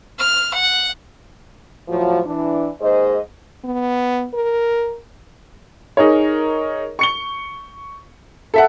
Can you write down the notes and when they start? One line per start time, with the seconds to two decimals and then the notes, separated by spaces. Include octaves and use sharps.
0.19 F6
0.54 F#5
1.89 A2 F3 F#3
2.26 E3 D4
2.81 D#2 G#2 G#4 C5 D#5
3.64 B3
4.34 A#4
5.97 D#4 G#4 A#4 C#5
6.99 C#6 C#7 G7
8.54 A4 E5 F#5